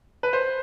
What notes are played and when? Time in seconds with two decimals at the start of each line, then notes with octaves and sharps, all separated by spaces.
0.23 B4
0.33 C5